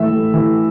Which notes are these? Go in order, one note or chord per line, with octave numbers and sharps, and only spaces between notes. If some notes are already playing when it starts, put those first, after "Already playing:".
Already playing: A2 E3 E5
A2
E3